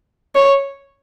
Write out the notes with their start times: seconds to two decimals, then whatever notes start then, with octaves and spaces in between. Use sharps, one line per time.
0.35 C#5